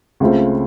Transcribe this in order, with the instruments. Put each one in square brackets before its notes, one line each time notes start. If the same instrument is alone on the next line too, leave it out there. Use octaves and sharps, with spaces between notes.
[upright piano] C#2 C#3 A3 C4 F4